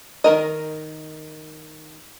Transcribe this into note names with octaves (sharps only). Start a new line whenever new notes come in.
D#3 C4 A#4 D#5